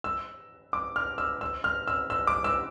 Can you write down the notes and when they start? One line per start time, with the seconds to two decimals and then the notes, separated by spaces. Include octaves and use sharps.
0.04 E6
0.73 D6
0.96 F6
1.18 E6
1.41 E6
1.64 F6
1.88 E6
2.10 E6
2.27 D6
2.44 E6